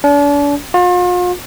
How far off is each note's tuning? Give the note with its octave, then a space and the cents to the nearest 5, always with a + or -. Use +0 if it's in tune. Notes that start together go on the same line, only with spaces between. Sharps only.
D4 -40
F4 +40